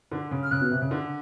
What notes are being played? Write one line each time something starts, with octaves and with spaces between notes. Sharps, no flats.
D3
C#3
F6
C#3 F#6
B2
C3
C#3
D3